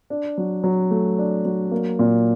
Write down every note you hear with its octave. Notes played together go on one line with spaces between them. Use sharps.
D4
F#3
F#3
A3
D4
F#3
A#3
A#2